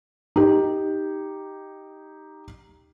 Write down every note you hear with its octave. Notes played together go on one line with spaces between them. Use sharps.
D#4 G4